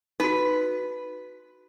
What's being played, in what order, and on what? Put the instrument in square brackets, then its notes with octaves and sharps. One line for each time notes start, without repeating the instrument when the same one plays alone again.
[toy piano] D#4 F#4 [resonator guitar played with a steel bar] B4